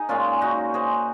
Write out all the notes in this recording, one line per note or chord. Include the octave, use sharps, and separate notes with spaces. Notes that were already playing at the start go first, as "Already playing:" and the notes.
Already playing: D#4 G#4
A#2 G#3 C#4 F4
D#4 F#4
G#4 C5